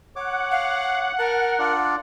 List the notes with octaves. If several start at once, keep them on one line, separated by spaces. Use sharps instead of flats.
C#5 F#5 D6
F5
A#4 A5
D4 F4 D5